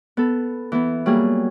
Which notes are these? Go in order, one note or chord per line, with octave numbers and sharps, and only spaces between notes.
B3 A4
E3 B3
F#3 G3 A#3 G#4